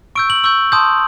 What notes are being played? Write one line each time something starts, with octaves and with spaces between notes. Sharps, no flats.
C#6 E6 G6 D7
F#7
C#6 E6 G6 F#7
A5 C6 D#6 G6